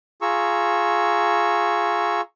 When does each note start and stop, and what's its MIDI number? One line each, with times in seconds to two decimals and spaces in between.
0.22 2.21 65
0.22 2.21 68
0.22 2.21 82
0.22 2.21 85
0.22 2.21 88